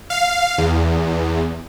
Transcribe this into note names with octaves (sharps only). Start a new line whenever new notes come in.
F5
E2